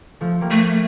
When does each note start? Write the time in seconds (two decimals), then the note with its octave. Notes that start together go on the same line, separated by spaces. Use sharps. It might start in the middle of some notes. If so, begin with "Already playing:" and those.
0.21 F3 A3
0.41 G3 A#3
0.51 A3